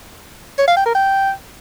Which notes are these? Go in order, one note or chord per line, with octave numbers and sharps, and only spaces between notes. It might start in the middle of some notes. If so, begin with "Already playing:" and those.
C#5
F5
G5
A#4
G5